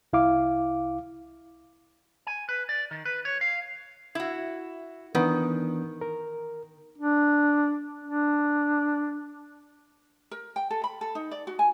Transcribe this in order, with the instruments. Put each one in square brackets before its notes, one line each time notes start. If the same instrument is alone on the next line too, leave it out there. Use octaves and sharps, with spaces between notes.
[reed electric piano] C2 E4 F5 D6
[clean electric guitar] G#5
B4
D5
D#3
B4
C#5
F5
[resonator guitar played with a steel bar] E4 F#4
[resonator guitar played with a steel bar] D#3 [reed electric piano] E3 B3 D4
[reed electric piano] A#4
[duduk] D4
D4
[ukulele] A#4
G5
A4
B5
A4
D#4
D5
F#4
G#5